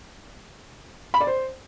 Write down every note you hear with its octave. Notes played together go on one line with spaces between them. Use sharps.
B5
D5
C5